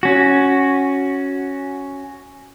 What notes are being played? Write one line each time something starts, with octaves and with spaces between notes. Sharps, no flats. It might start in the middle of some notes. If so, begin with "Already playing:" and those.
C#4 F#4